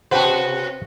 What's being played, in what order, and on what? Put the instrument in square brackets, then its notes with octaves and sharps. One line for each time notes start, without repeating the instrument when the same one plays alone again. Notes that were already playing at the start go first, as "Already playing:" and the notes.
[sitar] C3 F#4 B4 [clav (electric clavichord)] C5 F#5 G5